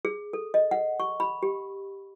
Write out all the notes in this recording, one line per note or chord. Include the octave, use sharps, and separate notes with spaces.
G#4
A4
D#5
F#5
C#6
B5
G4